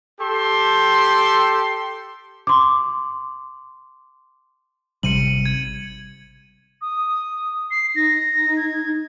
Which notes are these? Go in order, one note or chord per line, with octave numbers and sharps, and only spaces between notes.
G4 A4 C6
C6 D6
G#1 C3 G3 C#7 D#7 F#7
G#6
D#6
C7
D#4 A#6
G#6